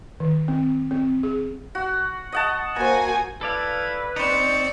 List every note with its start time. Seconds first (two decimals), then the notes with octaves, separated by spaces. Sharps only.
0.20 D#3
0.48 C4
0.91 C4
1.23 G#4
1.75 F#4
2.32 D#5 F#5 A5
2.76 A#3 F#4 C5 G#5 A#5
3.41 E4 A4 B4 D5 F5
4.16 C4 D#4 C5 D5 C#6